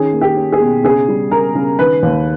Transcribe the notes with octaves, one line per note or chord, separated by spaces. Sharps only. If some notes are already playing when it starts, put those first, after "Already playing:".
Already playing: D#3 C#4 G#4
A#3
G4
C#4
G#4
B2
C#3 G#4
G3
C#3 A#4
C#3
D#3 B4
D#2